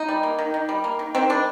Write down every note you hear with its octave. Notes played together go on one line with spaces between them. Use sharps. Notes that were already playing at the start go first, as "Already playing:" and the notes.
Already playing: D#4
G3
A#3
D#3
D#3
G3
A#3
D#3
D#3 C4
G3 D4